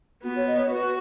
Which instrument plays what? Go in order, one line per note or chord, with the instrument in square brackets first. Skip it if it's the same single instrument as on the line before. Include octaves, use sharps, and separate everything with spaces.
[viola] B3 [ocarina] F#4
[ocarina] C#5
D#5
C#5
[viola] F#4 [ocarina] B4